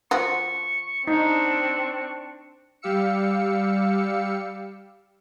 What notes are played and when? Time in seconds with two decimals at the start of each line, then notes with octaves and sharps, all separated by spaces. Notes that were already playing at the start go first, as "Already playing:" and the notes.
0.11 F3 F#4 C#6
1.07 C4 D4 D#4 C#6
2.82 G3 G4 F5 E6 C#7